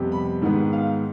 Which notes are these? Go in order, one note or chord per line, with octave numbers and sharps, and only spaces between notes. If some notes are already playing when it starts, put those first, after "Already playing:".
Already playing: F2 C3 G3 B3
B5
G#2 D#3 G#3 B3
F5